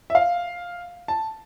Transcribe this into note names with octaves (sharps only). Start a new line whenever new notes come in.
E5
F5
A5